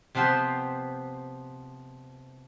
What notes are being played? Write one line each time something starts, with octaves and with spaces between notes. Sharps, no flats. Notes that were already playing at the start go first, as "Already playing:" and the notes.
C3 F3 B3 B4 C5